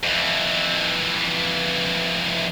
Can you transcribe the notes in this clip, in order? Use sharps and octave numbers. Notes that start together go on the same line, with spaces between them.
F2 E3